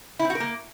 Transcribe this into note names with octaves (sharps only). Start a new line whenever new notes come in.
E4
C4
F#4
A#4
A#3